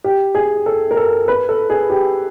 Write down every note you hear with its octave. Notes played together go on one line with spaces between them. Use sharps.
G4
G#4
A4
A#4
A4
B4
A4
G#4
G4